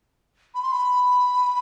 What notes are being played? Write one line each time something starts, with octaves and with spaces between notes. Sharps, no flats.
B5
C6
B5